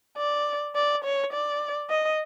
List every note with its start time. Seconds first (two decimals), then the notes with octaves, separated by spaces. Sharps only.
0.17 D5
0.75 D5
1.04 C#5
1.33 D5
1.90 D#5